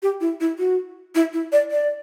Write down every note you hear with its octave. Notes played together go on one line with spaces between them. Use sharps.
G4
E4
E4
F#4
E4
E4
D5
D5